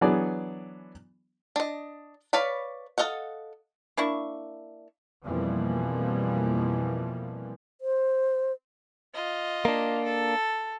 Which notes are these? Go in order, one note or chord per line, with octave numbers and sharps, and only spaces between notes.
E3 F#3 B3 D4 G#4 D5
D4 D#5
B4 C#5 D5 F5 B5
A4 A#4 D#5 F5 F#5
A#3 D4 E4 C#6
F2 B2 E3 F3 G3 A#3
C5
F4 D#5
A#3 D4
A4